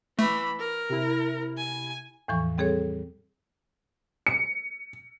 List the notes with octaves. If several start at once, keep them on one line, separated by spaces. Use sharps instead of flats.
E3 A3 B5
A#4
C3 E4
G#5
E2 A2 E3 F3 C#6
G3 C4 G#4 A4 C#5
C#7